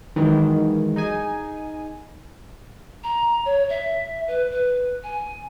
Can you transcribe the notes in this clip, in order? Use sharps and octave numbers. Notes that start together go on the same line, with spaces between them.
D#3 E3 F#3 G#3
D#4 G#4 G#5
A#5
C#5
E5
B4
B4
G#5